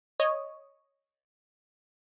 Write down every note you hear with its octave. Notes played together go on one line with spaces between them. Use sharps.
C#5 D#5